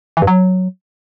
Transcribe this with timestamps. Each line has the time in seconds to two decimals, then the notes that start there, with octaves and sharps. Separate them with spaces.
0.17 E3
0.22 G2
0.27 F#3